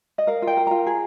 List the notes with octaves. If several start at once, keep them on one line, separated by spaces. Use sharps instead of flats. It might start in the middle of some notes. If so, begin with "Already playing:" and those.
D#5
A#4 F5
F4
G5
A#4
F4 A#5
G#4